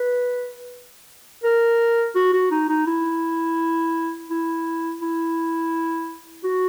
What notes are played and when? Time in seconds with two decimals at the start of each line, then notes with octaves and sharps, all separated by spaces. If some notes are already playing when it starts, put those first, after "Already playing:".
Already playing: B4
1.44 A#4
2.15 F#4
2.33 F#4
2.51 D#4
2.69 D#4
2.87 E4
4.30 E4
5.01 E4
6.44 F#4